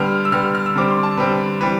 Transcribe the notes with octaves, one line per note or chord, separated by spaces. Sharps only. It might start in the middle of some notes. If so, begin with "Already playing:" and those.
Already playing: D3 G3 B3 F6
E6
D3 G3 B3 F6
F6
E6
D3 G3 C4 D6
C6
A5
D3 G3 C4 B4
E3 G3 C4 B4